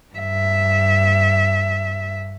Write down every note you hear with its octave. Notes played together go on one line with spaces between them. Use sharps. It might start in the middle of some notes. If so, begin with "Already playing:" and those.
G2 E5